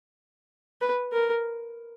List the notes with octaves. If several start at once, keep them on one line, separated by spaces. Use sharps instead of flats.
B4
A#4